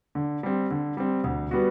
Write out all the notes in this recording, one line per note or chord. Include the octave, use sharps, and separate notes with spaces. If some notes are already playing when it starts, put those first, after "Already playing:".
D3
G3 C4
D3
G3 C4
D2
G3 B3 F#4